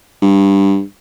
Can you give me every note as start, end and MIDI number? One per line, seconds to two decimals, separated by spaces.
0.22 0.82 43